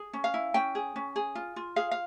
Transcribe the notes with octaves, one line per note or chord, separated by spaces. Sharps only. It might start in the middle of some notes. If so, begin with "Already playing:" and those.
Already playing: G#4
C#4
F5
E4
C#4 G5
G#4
C#4
G#4
F4
F4
G#4 F5
F5